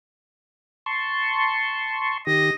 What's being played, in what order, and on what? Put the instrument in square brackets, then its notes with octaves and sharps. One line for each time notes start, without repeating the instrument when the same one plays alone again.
[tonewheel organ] A5 C6 C#6
[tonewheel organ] D#3 G4 [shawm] D#5